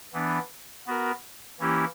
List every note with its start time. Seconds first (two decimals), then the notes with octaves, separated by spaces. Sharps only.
0.13 E3 B3 D4
0.87 B3 F#4 A#4
1.60 E3 A#3 C#4 E4 G4